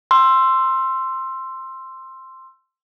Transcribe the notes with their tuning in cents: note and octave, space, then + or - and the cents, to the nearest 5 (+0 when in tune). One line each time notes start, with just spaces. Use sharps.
C6 +5 E6 +20